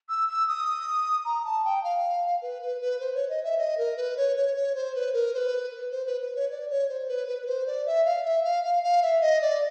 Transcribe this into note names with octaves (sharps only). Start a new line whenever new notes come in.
E6
E6
D#6
A#5
A5
G5
F5
B4
B4
B4
C5
C#5
D#5
E5
D#5
A#4
B4
C#5
C#5
C#5
C5
B4
A#4
C5
B4
C5
B4
B4
C#5
D5
C#5
C5
B4
B4
B4
C5
D5
E5
F5
E5
F5
F5
F5
E5
D#5
D5